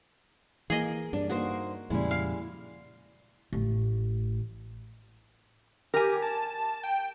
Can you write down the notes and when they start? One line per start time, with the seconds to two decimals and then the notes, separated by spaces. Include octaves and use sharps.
0.70 E3 A#3 G#4 D#5
1.13 G2 D4
1.29 A#3 D#4 F#4 C5
1.90 F2 A#2 C#3 G3 G#3 E4
2.11 F5
3.53 A1 A3
5.94 G4 A#4 G#5
6.22 A5
6.84 G5